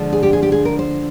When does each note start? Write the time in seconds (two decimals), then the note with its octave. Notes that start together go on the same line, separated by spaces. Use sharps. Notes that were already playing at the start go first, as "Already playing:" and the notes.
Already playing: D2 D3 F3 G#3 D4
0.13 G#4
0.23 G4
0.33 G#4
0.43 G4
0.52 G#4
0.65 A#4
0.79 C5